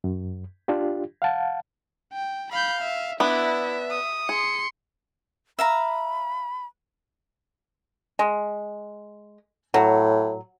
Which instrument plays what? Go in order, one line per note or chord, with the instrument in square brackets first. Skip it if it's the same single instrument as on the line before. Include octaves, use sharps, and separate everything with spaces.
[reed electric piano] F#2
D4 F4 G4
F5 F#5 A5
[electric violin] G5
[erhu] F5 [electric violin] B5 G6
[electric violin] E5
[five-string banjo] B3 D4 [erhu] E4 [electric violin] E5
[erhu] D#6
[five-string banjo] G#4 [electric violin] C6 C#7
[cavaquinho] E5 F5 A#5 [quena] B5
[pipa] G#3
[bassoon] A2 [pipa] F#3